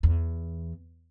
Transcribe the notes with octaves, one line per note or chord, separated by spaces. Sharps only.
E2